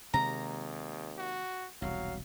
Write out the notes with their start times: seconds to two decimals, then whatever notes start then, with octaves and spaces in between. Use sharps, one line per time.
0.14 D#2 C3 D#3 G#3 A#5
1.18 F#4
1.82 E1 C2 F#3 F5